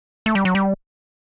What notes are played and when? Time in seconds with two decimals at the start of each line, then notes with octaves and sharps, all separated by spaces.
0.26 A3
0.35 G3
0.45 F#3
0.55 G3